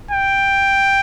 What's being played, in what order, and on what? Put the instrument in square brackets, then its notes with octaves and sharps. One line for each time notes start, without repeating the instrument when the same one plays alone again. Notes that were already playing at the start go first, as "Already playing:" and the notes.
[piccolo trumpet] G5